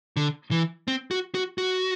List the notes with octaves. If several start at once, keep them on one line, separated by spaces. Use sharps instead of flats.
D3
E3
C4
F#4
F#4
F#4